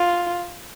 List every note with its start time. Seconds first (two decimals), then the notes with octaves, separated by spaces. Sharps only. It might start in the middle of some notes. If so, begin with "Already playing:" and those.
Already playing: F4